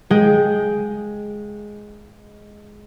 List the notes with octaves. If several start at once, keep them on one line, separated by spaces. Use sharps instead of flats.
G#3 G#4 G5